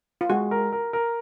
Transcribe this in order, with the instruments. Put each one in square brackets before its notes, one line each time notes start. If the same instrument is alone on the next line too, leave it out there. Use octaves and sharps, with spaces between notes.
[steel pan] F4
[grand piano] G#3 [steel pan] F#4
[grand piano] A#4
A#4
A#4